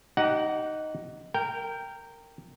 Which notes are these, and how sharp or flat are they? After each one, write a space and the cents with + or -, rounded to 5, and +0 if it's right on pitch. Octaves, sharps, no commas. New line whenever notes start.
D#4 +0 G4 -30 F#5 +0
A#4 -15 G5 +0